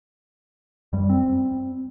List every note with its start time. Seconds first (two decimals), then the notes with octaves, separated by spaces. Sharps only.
0.93 F#2 G3
1.09 C4